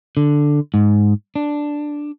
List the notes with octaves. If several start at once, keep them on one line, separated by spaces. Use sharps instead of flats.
D3
G#2
D4